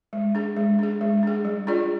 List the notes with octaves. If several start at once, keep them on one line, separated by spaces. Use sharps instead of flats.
G#3
D4 G#4
G#3
D4 G#4
G#3
D4 G#4
G3
D4 F4 G#4 D5